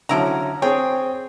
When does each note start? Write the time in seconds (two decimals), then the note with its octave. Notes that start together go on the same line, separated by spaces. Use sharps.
0.09 D3 F3 F#3 C#4 E4 A#5
0.62 C4 G#4 C#5 G5